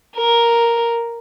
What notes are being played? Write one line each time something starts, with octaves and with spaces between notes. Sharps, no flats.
A#4